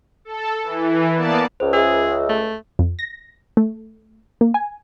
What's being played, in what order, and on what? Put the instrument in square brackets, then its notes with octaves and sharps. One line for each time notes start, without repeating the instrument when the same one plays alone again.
[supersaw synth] A4
E3
A#3 B3 D5 A5
[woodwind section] C#2 [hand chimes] C5
[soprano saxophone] G#4 [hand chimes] E5 E6
[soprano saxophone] A3
[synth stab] F2
A#6
A3
A#3
G#5